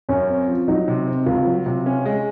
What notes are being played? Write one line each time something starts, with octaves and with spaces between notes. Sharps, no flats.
F#2 C#4
C4
F3
F#3 D#4
C3
C4
C#2 F4
F#3
C3
C#4
G#3